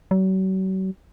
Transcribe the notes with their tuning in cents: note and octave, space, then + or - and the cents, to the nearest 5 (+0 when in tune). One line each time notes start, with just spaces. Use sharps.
F#3 +40